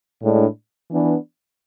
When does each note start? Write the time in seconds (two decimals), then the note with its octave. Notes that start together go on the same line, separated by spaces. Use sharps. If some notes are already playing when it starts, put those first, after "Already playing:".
0.21 A2 G#3 D4
0.91 E3 B3 D4